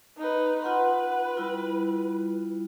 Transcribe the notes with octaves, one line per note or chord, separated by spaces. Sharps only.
D#4 B4
F4 B4 F#5 C6
G3 E4 F4